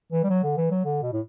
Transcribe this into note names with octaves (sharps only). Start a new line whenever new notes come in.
E3
G3
F#3
D3
E3
F#3
D3
B2
A2